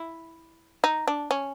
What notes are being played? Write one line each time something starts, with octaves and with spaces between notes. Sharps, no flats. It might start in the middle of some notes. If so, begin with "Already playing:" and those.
Already playing: E4
D#4
D4
C#4